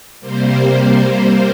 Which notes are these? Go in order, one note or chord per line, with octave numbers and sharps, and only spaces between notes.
C3 G3 A#3 C5